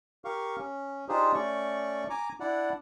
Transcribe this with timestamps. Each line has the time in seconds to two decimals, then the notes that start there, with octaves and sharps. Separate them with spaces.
0.25 G4 A#4 F5 C#6
0.58 C#4
1.09 D4 D#4 F4 G4 G#4 C5
1.34 A3 C#4 D5 C#6
2.10 G#5 A#5 D6
2.40 D4 E4 D5 F#5